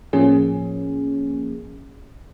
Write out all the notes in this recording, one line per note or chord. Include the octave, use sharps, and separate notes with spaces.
A2 F3 A#3 C#4 G#4